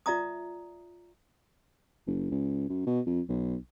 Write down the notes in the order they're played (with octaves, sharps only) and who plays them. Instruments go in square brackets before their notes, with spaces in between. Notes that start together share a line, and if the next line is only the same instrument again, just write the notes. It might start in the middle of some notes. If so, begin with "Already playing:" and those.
[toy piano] F4 D5 E5 A#5 D#6
[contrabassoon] F#1
C#2
F#2
B2
F2
B1